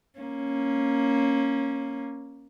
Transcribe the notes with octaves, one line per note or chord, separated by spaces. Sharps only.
A#3 C#4